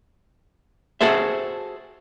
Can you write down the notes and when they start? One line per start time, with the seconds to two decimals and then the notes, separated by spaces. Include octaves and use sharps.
1.01 F#4 G#4 A4 C5 E5